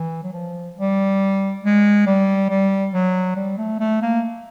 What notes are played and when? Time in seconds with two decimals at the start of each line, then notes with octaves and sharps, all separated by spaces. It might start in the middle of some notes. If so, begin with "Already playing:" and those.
Already playing: E3
0.23 F#3
0.33 F3
0.77 G3
1.64 G#3
2.07 G3
2.50 G3
2.93 F#3
3.36 G3
3.58 A3
3.80 A3
4.02 A#3